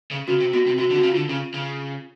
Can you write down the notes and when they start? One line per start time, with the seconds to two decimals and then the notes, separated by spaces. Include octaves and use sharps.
0.11 C#3
0.28 C#3 F#4
0.40 C3
0.53 B2 F#4
0.66 C3
0.78 C3 F#4
0.90 D3
0.96 C3 F#4
1.03 C#3
1.12 D3 F4
1.29 C#3
1.54 C#3